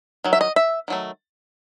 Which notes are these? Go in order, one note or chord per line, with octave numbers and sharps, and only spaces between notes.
D#3 F#3
E5
D#5
E5
D#3 F#3 A3